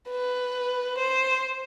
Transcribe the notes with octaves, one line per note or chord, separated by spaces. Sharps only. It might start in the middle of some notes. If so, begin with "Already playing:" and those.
B4
C5